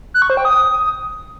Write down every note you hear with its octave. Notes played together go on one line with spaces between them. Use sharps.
F#6
C#6
C5
G5
D#6